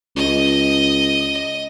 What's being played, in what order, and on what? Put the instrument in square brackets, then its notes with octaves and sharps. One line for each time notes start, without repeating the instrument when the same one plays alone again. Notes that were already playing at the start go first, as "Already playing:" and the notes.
[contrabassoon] C#2 [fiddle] D#5